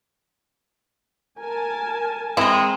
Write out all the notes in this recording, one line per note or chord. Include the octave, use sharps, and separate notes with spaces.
A#4 G#5 A5
E3 G#3 C4 E4 A#4